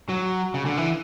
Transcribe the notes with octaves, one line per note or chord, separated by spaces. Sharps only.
F#3
C#3
D3
E3